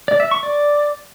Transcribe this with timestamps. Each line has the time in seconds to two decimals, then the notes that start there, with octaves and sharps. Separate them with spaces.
0.08 D5
0.20 E5
0.31 C#6
0.43 D5